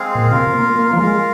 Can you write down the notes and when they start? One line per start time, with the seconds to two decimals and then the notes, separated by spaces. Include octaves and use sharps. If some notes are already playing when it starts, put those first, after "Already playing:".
Already playing: G#3 C4 G#4 F5
0.15 A#2
0.31 C3 F4 A#4 F5
0.54 A#3
0.76 A#3
0.93 F3
0.98 G#3 F4 A#4 F5